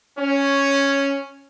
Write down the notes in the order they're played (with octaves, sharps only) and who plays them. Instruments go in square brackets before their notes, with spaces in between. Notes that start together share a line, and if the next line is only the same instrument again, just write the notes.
[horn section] C#4